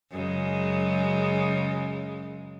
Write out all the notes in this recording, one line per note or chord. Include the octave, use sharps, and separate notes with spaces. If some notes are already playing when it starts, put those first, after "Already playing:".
F#2 C#3 G#3